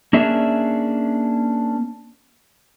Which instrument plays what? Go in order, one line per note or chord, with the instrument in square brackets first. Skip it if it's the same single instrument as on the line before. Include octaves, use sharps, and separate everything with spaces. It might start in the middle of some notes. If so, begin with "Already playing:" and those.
[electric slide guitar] A#3 C#4 D4 G#4 E5